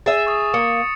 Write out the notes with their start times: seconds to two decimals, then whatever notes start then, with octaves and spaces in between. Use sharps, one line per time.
0.06 G#4 E5 A6 E7
0.27 C#6 D#6
0.54 A#3 D#6 C#7